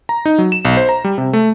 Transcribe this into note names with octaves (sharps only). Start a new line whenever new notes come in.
A#5
D#4
F#3
E7
B1
C5
A#5
G3
C3
A3